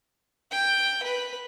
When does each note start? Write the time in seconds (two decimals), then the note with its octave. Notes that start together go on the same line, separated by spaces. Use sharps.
0.51 G5
1.03 B4